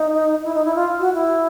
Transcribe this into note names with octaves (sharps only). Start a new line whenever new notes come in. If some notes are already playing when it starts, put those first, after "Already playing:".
Already playing: D#4
E4
D#4
E4
F4
F#4
E4